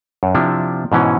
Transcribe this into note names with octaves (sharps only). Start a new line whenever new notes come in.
F#2
C3 F3 D4 E4
G#2 B2 E3 C#4